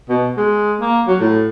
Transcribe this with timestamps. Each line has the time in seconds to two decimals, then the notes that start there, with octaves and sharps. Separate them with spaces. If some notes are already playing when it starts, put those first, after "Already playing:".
0.09 B2
0.37 G#3
0.81 A#3
1.08 F#3
1.20 A2